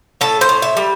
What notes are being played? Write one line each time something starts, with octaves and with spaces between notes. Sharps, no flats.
A2 A4
C5
A2
E5
G3